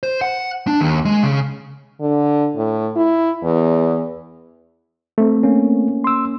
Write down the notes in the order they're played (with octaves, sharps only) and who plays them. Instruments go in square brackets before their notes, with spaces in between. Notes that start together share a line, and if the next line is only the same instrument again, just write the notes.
[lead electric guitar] C5
F#5
D4
D#2
G#3
C#3
[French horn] D3
A2
E4
E2
[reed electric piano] A3 C4
[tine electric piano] A#3 C#4
[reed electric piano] C6 E6